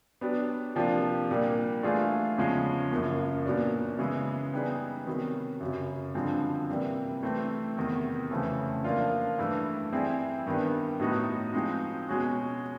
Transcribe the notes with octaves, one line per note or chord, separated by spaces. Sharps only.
F#3 B3 D4 G4
C3 F3 A#3 D4 G4
A#2 G3 A#3 D4
E3 A3 D4 F4 G#4
E2 C#3 F3 G#3 C#4
F#2 C#3 F3 A#3
A#2 F#3 B3 D4
C#3 E3 G#3 B3
G3 B3 D#4 G#4 B4
C3 D#3 F#3 B3
F#2 C#3 F#3
G2 D3 F3 G#3 C4
C3 E3 G3 A#3
E3 A3 C4
E2 C3 D#3
F2 C#3 E3 A3 C#4
F3 A#3 D4 F4
G2 E3 A3
G3 C4 E4 G#4
G2 D#3 G3 B3
A2 F#3 B3 D#4 F#4
F3 G#3 C4 D#4
B2 G#3 C#4 F#4